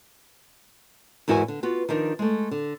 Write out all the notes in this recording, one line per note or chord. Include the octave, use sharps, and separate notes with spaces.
E2 G#2 E4 F#4 A#4 G#5
D3
B3 F4 F#4
D#3 F3 D4 D#4 A#4
G#3 A3
D3